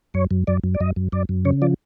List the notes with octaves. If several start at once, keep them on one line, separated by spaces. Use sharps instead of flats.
F#2 C#5
F#2
F#2 D5
F#2
D5
F#2 D#5
F#2
F#2 D5
F#2
C#3 C#5
F3 D5